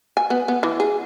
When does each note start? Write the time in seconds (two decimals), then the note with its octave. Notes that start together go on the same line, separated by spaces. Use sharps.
0.17 G#5
0.30 B3
0.48 B3
0.63 E3
0.80 G#4